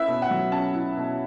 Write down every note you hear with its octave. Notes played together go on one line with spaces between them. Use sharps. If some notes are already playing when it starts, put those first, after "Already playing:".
Already playing: C#4 E4 B4 E5
B2
F#5
F#3
C#4 A5
E4
B2